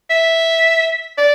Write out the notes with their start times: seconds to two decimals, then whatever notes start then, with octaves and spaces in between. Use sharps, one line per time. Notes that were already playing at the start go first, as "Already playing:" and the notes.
0.10 E5
1.18 D5